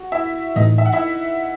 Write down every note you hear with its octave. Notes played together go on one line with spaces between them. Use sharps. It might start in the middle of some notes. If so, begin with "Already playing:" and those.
Already playing: F#4
E4 E5
A2 E3 A3 D#4 D#5
E5
F#5
E4 E5